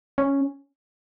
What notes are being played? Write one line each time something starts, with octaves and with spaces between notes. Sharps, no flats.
C#4